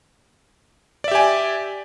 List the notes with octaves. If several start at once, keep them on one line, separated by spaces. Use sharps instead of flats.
G4 D5 E5 G#5